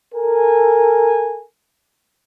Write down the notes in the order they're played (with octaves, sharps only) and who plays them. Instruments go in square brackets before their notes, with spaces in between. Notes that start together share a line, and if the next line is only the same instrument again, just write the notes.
[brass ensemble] A4 A#4 G#5